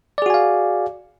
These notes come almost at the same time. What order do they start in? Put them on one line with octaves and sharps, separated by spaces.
D5 G#4 F#4 G#5 F5